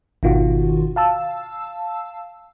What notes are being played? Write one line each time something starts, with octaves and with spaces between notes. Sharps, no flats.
G#1 B2 D#3 F4 F#4
F5 A5 E6